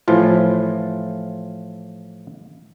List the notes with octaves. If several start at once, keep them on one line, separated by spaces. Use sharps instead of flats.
A2 E3 F3 F4